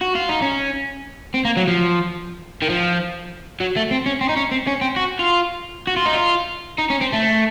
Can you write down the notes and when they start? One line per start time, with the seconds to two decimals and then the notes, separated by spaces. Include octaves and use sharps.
0.01 F#4
0.15 F4
0.29 D#4
0.43 C#4
1.34 C4
1.45 A#3
1.57 F#3
1.68 F3
2.62 D#3
2.69 F3
3.60 F#3
3.76 A3
3.91 C4
4.06 C#4
4.21 C4
4.29 D#4
4.36 C#4
4.51 C4
4.67 C#4
4.81 C4
4.96 F#4
5.19 F4
5.87 F#4
5.96 F4
6.06 D#4
6.14 F4
6.78 D#4
6.90 C#4
7.02 C4
7.13 A3